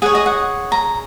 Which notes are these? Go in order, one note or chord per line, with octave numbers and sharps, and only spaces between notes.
G#4 C#5 F#5
D#5
F#5
A#5